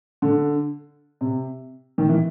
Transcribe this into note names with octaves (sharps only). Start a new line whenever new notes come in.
D3
C3
D#3
E3